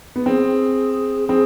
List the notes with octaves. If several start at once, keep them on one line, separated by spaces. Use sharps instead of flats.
B3
C4 G#4
C4 G#4